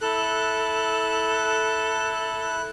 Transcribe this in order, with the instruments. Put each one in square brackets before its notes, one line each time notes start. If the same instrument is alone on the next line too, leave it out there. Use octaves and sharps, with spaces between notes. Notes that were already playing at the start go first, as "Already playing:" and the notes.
[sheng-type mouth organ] E4 F#6 [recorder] A4